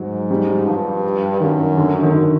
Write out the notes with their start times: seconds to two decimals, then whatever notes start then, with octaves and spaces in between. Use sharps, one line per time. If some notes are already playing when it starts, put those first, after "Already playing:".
Already playing: G#2 F#3
0.31 G3
0.66 G2 F3
1.40 F#2 D#3
1.77 D3
2.03 D#3
2.14 D#3